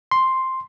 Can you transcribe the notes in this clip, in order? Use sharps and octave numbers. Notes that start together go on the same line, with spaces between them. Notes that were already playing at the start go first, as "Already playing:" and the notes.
C6